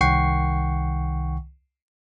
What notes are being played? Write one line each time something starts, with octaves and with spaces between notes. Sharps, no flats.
C2 D#3 F#5 G5 C#6 C7